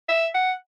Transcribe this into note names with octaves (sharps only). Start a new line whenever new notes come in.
E5
F#5